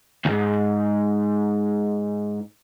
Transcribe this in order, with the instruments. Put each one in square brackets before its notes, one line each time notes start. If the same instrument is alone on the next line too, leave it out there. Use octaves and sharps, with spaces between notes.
[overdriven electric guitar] D2 G#2